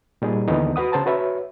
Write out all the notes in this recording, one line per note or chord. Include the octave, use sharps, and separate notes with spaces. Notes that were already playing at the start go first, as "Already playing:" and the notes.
A#2 G3 D#4 G#4
D#2 D3 E3 G#3 B3 D#4
F#4 B4 F#5 D#6
C#3 C5 A5 A#5
F#4 B4 C#5 E5